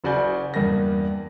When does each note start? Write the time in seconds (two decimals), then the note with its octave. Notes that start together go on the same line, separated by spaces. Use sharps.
0.04 F#1 C#3 F#4 D5 G#5 G6
0.54 E2 G2 A#3 A#6